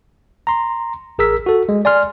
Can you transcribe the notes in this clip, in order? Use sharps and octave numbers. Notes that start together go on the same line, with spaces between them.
A#5 C6
A1 G#4 A#4 E6 B6
F#4 A4
G#3
D5 G#5 C6 F6